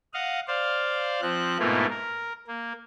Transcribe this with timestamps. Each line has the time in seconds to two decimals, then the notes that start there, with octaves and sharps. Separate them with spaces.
0.14 D#5 F5 F#5
0.48 C5 D5 F5
1.22 F3 C4 F#6
1.59 G#2 B2 A3 A#3 E4 F4
1.90 A#4
2.47 A#3